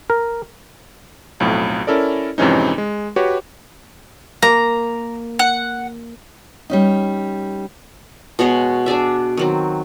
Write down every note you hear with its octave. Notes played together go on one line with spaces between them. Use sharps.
A#4
B1 F2 A2
C#4 E4 A4 A#4 D5
F2 G#2 C3 E3 C#4 D#4
G#3
F#4 G4 B4 C#5
A#3 A#5
F#5
G3 C#4 D#4
B2 G#3 G#4 C#5
D4 G#4 D5 E5
D#3 F#3 C4